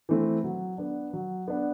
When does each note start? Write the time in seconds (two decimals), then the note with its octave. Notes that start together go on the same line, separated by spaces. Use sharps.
0.09 E3 A3 C4
0.44 F#3
0.78 B3 D4
1.13 F#3
1.48 B3 D4